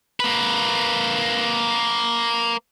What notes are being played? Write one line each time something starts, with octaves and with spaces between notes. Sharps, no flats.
A#3 B4